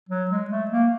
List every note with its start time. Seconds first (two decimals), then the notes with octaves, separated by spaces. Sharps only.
0.09 F#3
0.31 G#3
0.50 A3
0.71 A#3